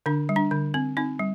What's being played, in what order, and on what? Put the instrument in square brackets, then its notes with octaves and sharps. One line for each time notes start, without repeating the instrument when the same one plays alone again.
[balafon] D3 D4
G3
D4
D3
C4
C4 D#4
G3